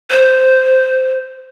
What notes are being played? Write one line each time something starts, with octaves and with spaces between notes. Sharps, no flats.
C5